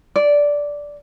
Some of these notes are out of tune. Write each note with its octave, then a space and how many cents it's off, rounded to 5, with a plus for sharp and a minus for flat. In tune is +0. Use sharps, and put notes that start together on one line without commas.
D5 -10